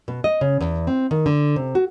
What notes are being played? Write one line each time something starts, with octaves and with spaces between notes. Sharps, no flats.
B2
D#5
C#3
E2
C4
D#3
D3
C3
F#4